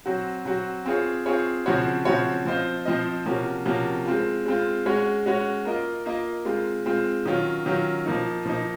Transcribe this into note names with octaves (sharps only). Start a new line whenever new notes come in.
F#3 C4 F#4
F#3 C4 F#4
C4 F4 G#4 C#5
C4 F4 G#4 C#5
C#3 F3 C4 F#4 C#5
C#3 F3 C4 F#4 C#5
F3 C4 F4 C5 D#5
F3 C4 F4 C5 D#5
C3 F3 A#3 C#4 F#4
C3 F3 A#3 C#4 F#4
G#3 C4 F4
G#3 C4 F4
G#3 C#4 F#4 C#5
G#3 C#4 F#4 C#5
A#3 F4 A#4 D#5
A#3 F4 A#4 D#5
G#3 C4 F4
G#3 C4 F4
D#3 F#3 C#4 F4
D#3 F#3 C#4 F4
F3 A#3 D#4
F3 A#3 D#4